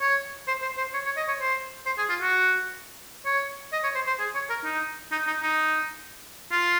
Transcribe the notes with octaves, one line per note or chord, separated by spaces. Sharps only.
C#5
C5
C5
C5
C#5
C#5
D#5
C#5
C5
C5
G#4
F4
F#4
C#5
D#5
C#5
C5
C5
G#4
C#5
A#4
D#4
D#4
D#4
D#4
F4